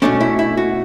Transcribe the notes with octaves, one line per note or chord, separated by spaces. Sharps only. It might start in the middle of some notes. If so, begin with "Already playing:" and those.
B2 A3 C#4 D4
E4
E4
F#4